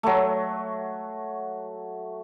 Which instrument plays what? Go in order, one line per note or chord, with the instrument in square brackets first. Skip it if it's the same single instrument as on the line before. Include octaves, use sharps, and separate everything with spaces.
[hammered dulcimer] F#3 A3